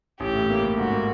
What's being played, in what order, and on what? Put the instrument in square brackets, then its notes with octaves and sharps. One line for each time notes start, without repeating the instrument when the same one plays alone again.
[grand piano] A1 [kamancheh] G4
[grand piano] A2
A#3
A2
[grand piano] G#2 [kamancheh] F#4
[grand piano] A#3